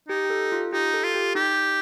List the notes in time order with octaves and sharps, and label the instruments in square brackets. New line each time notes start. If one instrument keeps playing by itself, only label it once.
[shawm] D#4 [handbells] G4
[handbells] G4
A4
F4
[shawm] D#4 [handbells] G4
[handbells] A4
[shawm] F4
[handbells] G4
[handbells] D#4 [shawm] G4